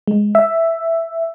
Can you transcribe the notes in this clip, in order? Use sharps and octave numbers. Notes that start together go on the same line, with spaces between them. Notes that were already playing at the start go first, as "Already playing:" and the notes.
G#3
E5